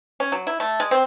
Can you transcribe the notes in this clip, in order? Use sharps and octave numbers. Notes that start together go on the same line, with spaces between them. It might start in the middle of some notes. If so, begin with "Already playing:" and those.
C#4
F#3
E4
A3
G#3
C4